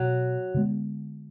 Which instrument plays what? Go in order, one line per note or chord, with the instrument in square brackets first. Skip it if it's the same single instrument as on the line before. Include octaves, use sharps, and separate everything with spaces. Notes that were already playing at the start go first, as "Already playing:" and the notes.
Already playing: [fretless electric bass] B2 [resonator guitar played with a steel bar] F#3
[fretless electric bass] D3 G#3 B3